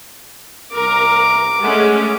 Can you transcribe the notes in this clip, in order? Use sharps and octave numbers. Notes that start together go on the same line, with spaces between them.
C2 A#4 A#5 D6
G#3 A3 C#4 G#4 F#5